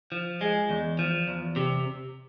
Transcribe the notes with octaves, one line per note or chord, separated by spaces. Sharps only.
F3
G#3
E2
F3
E2
C3